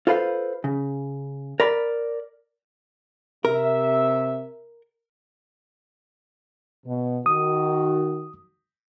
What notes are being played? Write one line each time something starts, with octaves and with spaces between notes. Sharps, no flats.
F4 A4 B4 C5 F5
C#3
A#4 D5 B5
C3 A#4 E5
B2
D#3 F#4 D#6